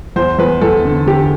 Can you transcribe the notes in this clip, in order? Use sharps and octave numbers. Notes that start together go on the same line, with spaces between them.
E2 C5
E2 B4
E2 A4
D3
D3 G4